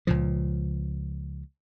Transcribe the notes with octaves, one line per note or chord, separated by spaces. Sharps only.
C#2 A#2 F3